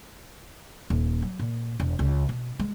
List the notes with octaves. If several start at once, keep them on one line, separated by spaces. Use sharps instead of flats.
D#1
F#3
A#2
E1
C#2
B2
G#3